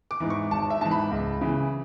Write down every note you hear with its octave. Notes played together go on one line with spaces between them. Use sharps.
D6
G#2 E3
C#6
G#1 A5
E5
G#2 E3 A5
B5
C#2
C#3 E3